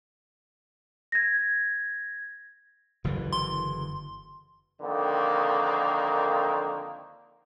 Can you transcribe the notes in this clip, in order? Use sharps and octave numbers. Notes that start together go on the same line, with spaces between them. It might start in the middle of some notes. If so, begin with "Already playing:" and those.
G#6 A#6
F#1 D3 E3
C6
F2 D3 D#3 A#3